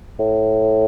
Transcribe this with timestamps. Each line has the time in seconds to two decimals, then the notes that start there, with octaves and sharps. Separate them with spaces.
0.19 A2